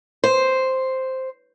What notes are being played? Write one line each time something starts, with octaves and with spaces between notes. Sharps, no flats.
C5